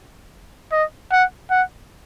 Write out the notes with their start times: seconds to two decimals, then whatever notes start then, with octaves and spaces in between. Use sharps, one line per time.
0.72 D#5
1.12 F#5
1.51 F#5